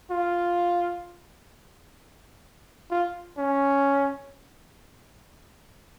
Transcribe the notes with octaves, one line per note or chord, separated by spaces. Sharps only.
F4
F4
C#4